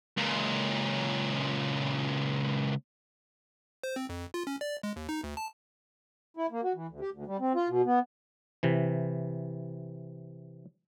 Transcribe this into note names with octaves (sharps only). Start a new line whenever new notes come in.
C#2 A#2
C5
C4
F2
F4
C#4
D5
G#3
D#2
D#4
D2
A5
E4
A#3
F#4
E3
D2
G4
D2
G3
C4
F4
B2
B3
C3 E3